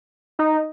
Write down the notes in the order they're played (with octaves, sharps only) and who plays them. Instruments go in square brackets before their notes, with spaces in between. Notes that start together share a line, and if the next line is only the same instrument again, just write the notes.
[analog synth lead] D#4